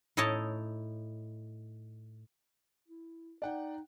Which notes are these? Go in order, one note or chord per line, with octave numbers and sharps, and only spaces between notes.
A2 D#4 E4 C#5 D#5 A5
E4
D#4 D5 F#5 G5